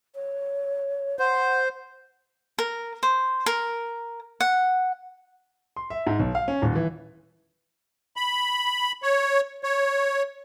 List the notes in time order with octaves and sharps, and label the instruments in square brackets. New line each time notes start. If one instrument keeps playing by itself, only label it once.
[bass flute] C#5
[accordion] C5 [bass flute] F#5
[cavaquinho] A#4
C5
A#4
F#5
[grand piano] C6
E5
G#2
B1
F5
C#4
D#1
E3
[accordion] B5
C#5
C#5